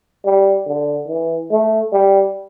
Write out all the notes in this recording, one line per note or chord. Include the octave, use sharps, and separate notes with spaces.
G3
D3
E3
A3
G3